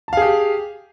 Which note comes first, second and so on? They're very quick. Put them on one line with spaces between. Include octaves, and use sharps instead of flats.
A5 F5 G#4 G4